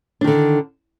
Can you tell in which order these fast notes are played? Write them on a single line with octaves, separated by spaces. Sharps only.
D4 D#3 D3